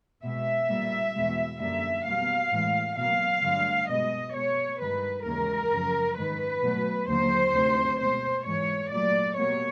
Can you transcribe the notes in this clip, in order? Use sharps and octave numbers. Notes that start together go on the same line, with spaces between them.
B2 G#3 E5
A#2 G3 A#3
E2 B2 G#3
F#2 D3 G3 A#3 E5
B2 G3 A#3 F5
A2 E3 G#3
B2 F#3 A#3 F5
G2 D3 F#3 A3
B2 G#3 D#5
B2 G#3 C#5
G2 D#3 G#3 B4
D#2 C#3 E3 G#3 A#4
F#2 C#3 F3
G#2 D#3 G#3 B4
B2 F#3 A3
D#2 D3 F#3 A#3 C5
D2 C3 D#3 F#3
B2 G#3 C5
G#2 E3 G#3 C#5
A#2 F#3 A3 D5
B2 G3 A#3 C#5